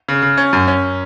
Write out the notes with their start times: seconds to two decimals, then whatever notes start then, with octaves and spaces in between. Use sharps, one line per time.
0.08 C#3
0.22 C#3
0.37 C#4
0.53 F#2
0.68 C#4